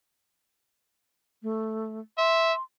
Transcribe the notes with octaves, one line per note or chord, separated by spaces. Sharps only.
A3
E5 C6